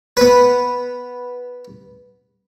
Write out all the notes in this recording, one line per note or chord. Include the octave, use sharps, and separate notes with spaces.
B3 B4